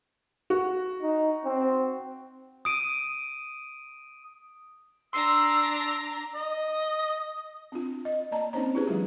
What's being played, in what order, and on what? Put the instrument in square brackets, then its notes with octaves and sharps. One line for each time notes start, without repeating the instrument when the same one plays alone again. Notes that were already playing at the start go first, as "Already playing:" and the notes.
[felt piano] F#4
[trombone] D#4
C4
[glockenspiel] D#6 D7 D#7
[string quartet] D4 A#5 [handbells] C6 C7 [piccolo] E6
[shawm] D#5
[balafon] C4 D4 F4
D#5
A#3 D5 D#5 A5 A#5
C4 C#4 D#4 C5 C#5 A#5
D4 E4 G4 G#4 B4 C#5
E3 F#3 G#3 F4